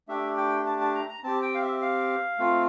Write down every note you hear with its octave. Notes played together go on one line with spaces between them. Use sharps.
A3 D4 G4 E5
G5
A5
A5
A#5
A#5
C4 G4 A5
G5
F5
E5
F5
A3 C4 F4